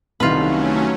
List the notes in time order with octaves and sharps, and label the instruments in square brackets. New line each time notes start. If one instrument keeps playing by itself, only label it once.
[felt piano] C2 D#3 [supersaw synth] F#3 A3 C#4 [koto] F4 B4